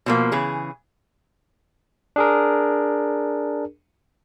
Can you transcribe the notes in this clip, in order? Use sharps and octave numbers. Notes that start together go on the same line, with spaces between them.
B2 F3 A#3
C#3 E3 G#4
D4 G#4 A#4